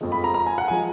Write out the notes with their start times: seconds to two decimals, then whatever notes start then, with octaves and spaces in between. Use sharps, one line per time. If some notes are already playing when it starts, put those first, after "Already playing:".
0.01 F2 F3 G#3
0.12 B5
0.24 A#5
0.34 A#5
0.46 G#5
0.58 F#5
0.68 F3 G#3 G#5